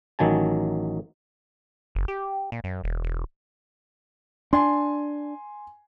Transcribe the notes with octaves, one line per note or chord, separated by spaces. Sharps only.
A1 D#3 F#3 G#5 A5
F#1
G4
A#2
F#2
E1
E1
D4 G#5 C6